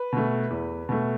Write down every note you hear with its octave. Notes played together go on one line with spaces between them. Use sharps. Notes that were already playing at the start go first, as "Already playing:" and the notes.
Already playing: B4
B2 A3
E2
B2 A3